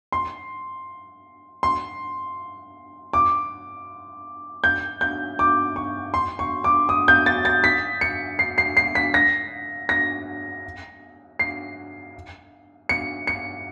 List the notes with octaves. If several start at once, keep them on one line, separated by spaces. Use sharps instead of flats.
C6
C6
D6
G6
G6
D6
C#6
C6
C#6
D6
D#6
G6
A6
A6
B6
C#7
C7
C7
C7
B6
A#6
A#6
C7
C#7
C#7